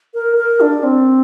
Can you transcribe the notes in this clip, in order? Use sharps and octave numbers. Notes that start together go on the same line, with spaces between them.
A#4
A#4
D4
C4